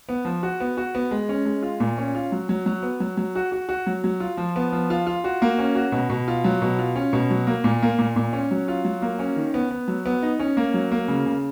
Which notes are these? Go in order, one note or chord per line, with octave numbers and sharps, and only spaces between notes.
B3
F3
F#4
B3
F#4
B3
G#3
C#4
G#3
F4
A#2
C#4
F4
F#3
F#3
F#3
B3
F#3
F#3
F#4
F#4
F#4
F#3
F#3
F4
F3
B3
F3
F4
F4
F#4
A#3
C#4
F#4
B2
B2
F4
F#3
B2
F4
C#4
B2
F#3
A#3
A#2
A#3
A#2
A#2
C#4
F#3
F4
F#3
A#3
C#4
D#3
B3
B3
F#3
B3
D#4
C#4
A#3
F#3
A#3
C#3
C#3